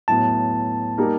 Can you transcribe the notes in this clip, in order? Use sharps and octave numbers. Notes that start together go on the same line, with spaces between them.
A2 F#3 B3 A5
G3 A#3 D#4 G4 A#4